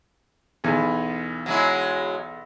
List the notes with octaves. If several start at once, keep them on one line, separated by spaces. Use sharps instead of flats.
B1 E2 G#5
F#3 G#3 E4